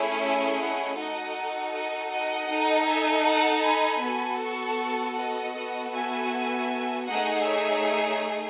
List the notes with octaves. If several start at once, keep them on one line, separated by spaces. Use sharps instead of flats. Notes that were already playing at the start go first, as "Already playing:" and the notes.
Already playing: A3 C#4 E4 G#4
E5 G#5
D#5 F#5
D#4 F#4 A4 D#5 F#5
D#5 F#5
D#5 F#5
D#4 A4
E5 G#5
F#5 A5
G#5 B5
B3 F#4 A4
A5 C#6
D#5 F#5
B3 F#4 A4
E5 G#5
A3 D#4 G#4 D#5 F#5
C#5 E5